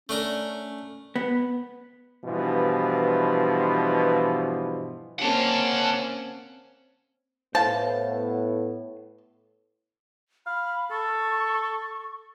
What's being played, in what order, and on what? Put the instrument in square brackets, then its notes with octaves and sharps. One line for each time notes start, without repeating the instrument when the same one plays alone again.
[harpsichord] A3 D4 A#4 [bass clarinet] C#4
[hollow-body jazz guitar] B3
[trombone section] G2 B2 E3 F3
[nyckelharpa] A#3 C4 [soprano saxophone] C#4 [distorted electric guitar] F#5 A5
[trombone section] A2 B3 [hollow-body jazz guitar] C5 F5 [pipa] A5
[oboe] F5 [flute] B5
[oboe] A4 [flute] C#6